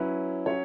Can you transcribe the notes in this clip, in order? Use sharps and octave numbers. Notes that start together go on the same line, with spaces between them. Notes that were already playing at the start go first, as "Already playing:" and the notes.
Already playing: F#3 C#4 E4 B4
F#3 C#4 C#5